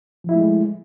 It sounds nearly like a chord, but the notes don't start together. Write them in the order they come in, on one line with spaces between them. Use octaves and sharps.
F3 E4 A3 G#3